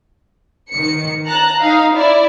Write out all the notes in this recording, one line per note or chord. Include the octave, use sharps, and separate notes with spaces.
D#3 C#7
A5 A#5 F#6
D#4 F5
E4 D5